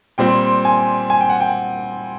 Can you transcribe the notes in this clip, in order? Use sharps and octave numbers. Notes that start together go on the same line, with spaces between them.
A#2 G3 C4 G5
G#5
G#5
G5
F#5
G5